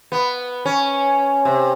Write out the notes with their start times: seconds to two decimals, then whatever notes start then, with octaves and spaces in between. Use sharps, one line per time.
0.12 B3
0.65 C#4
1.45 C3